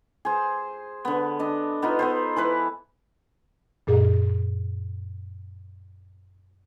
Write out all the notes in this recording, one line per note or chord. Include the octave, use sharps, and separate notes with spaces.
G#4 C5
D3 B3
D4 D#5
B3 D#4 F4
B3 A4 C5
E3 E4 B4
F#2 A#2 G#4